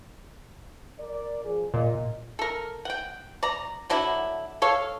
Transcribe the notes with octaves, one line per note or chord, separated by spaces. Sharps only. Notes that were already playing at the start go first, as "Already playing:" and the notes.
A#4 D5
F3 G#4
A#2 D#5
A4 A#4
F#5 G5
D5 A#5
D3 F#3 D4 E4
A4 C#5 F5